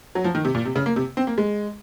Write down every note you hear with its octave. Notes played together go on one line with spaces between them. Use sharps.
F#3
F3
D#3
C3
A#2
C3
C#3
A#3
C3
C4
A#3
G#3